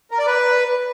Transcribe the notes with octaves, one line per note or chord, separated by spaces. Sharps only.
A#4
D5
B4